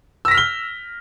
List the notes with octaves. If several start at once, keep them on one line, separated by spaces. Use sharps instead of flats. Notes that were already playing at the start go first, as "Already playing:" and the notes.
E6 F6 A#6 B6 G7